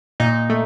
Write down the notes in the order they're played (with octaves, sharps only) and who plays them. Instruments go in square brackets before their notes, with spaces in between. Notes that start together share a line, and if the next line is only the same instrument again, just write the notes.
[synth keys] A#2 D#4
A3